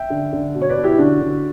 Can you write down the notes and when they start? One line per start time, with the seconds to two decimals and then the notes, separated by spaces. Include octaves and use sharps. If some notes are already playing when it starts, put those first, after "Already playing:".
Already playing: E5 G5
0.10 D3
0.32 D3
0.55 B2
0.62 C#5
0.69 B4 D5
0.77 B2
0.83 E4 G4
0.98 D3 D4 F#4
1.21 D3